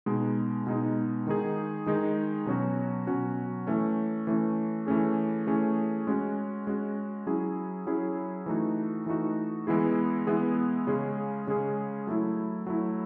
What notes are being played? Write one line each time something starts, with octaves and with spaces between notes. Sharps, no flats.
B2 G#3 D#4
B2 G#3 D#4
D#3 G#3 D#4 G#4
D#3 G#3 D#4 G#4
B2 F#3 C#4 F#4
B2 F#3 C#4 F#4
E3 A3 C#4
E3 A3 C#4
E3 A3 C#4 G#4
E3 A3 C#4 G#4
G#3 C#4 F#4
G#3 C#4 F#4
F#3 C#4 E4 G#4
F#3 C#4 E4 G#4
E3 A3 D#4 F#4
E3 A3 D#4 F#4
E3 G#3 B3 E4 G#4
E3 G#3 B3 E4 G#4
C#3 G#3 C#4 G#4
C#3 G#3 C#4 G#4
F#3 A3 E4
F#3 A3 E4